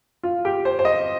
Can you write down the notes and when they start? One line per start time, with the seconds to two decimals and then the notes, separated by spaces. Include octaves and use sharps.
0.23 F4
0.45 G4
0.65 C5
0.79 C5
0.85 D#5